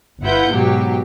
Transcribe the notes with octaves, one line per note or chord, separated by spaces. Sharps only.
G1 E4 F4 B4 F#5 G6
G#2 B2 F#3 G4